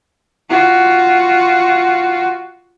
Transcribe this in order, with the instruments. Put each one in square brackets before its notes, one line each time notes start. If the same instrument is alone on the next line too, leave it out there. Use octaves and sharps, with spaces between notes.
[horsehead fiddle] F4 F#4